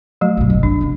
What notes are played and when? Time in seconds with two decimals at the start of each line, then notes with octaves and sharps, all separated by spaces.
0.21 F#3 A3
0.37 B1 G2
0.50 G1 C2
0.63 D4
0.81 F#2 C#3